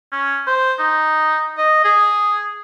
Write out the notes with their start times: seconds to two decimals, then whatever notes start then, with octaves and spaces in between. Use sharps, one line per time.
0.12 C#4
0.47 C5
0.79 D#4
1.57 D#5
1.85 G#4